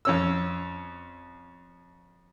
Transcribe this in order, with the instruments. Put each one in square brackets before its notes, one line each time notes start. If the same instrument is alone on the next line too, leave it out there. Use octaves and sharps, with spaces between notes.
[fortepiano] F2 C#4 E6